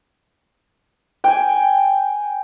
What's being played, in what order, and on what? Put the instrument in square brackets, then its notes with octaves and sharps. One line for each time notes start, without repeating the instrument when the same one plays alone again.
[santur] G5 G#5